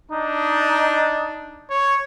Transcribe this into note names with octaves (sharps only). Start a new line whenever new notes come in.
D4 D#4
C#5